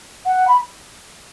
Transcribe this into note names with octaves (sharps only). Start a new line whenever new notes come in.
F#5
B5